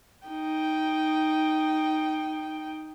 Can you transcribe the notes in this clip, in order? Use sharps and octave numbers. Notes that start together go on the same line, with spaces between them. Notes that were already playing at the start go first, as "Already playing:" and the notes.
D#4 G5